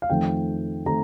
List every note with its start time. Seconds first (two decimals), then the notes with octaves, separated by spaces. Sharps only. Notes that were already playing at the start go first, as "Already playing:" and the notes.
0.02 F5
0.10 F2 D#3 A3 C4 G5
0.86 D#3 A3 C4 A#5